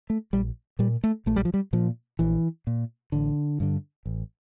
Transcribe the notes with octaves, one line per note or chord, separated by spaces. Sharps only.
A3
A#1 G3
A#2 G3
A3
A#1 A3
G3
F3
G3
A#2 F3
A#1 E3
A#2
A1 D3
G2 D3
A1